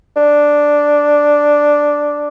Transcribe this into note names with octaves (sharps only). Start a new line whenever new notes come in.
D4